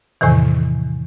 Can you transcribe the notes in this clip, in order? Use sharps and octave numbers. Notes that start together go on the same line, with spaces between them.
E2 A2 C3 D#3 E3